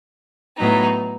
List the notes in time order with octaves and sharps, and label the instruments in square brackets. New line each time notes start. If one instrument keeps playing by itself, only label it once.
[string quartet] A2 F#3 B3 D#4